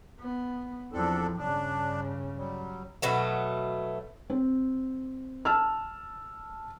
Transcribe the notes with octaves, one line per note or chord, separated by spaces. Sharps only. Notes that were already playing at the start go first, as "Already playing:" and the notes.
B3
E2 F3 C4 D4 A4
G2 C#3 D4
F#3 G3
B2 F#3 A3
C4
A5 E6 F6